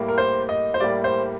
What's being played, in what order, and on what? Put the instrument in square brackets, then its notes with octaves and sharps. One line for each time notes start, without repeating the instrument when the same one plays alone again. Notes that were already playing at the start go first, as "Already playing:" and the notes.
Already playing: [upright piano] A2 G3 A#3
A#4
C5
D#5
C5
A2 G3 A#3 D5
C5